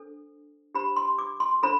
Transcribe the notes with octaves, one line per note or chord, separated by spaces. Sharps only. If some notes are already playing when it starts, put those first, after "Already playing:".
Already playing: D4 A4 C5
D4 G4 C5 B5
C6
D6
C6
D4 A4 C5 B5